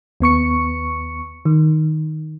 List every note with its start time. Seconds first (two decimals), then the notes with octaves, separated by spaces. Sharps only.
0.20 D#2 B3 C#6 C#7
1.45 D#3